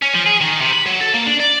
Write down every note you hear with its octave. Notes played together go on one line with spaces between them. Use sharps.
C#4
F3
G#4
D#3
C3
B5
F#3
A4
A#3
D4
D5